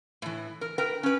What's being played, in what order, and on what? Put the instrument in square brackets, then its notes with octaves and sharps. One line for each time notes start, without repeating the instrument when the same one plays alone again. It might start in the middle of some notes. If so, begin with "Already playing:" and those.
[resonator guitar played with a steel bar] A2 E3
A#4
A#4 B4 G5
C#4 B4